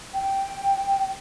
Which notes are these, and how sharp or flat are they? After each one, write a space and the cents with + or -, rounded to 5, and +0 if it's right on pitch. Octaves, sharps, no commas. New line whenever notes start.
G5 +0